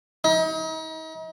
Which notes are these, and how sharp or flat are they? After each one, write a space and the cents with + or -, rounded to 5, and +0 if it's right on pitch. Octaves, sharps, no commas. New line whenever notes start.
D#4 +40